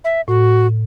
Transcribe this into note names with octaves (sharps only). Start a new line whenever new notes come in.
E5
A2 F#4